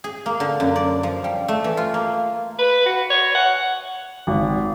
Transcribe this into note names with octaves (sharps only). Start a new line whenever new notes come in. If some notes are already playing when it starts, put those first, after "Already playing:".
G#4
A#3
D3
F#2
D5
F3
G3
A3
E3
F4
A#3
B4
F#4
C#5
F#5
G#1